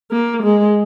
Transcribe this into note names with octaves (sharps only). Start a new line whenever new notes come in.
A#3
G#3